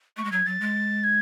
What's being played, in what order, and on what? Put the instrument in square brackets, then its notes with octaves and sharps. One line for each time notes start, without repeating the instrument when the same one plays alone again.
[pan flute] A3 [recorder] C#6
[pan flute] G#3
[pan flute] F#3 [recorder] G#6
[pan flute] F#3 [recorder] A6
[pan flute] G#3
[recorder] G#6